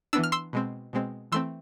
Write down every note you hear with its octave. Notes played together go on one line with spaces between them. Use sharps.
E3 B3 D4 E6
F6
C6 E6
B2 G#3 C4
B2 G#3 C4
E3 A3 C4 C6 E6